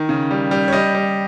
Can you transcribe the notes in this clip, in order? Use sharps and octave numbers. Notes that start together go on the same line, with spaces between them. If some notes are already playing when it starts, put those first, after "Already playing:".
Already playing: D#3
C#3
G3
G3
C#5
G3 D#5
G3